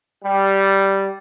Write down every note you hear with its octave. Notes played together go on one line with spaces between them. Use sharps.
G3